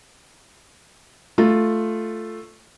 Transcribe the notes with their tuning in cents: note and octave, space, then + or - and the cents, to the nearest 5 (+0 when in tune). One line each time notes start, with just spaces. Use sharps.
A3 +0 F4 +0